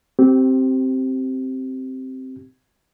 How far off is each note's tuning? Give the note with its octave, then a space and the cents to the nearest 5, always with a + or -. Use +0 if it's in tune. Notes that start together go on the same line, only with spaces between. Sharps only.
C4 +0 G4 -25